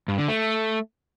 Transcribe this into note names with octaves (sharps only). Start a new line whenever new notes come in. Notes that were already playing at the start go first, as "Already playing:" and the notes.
G2
D3
A3